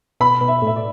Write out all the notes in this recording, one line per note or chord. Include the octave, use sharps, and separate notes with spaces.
B2 B5
B2
E5
A2
E5
D5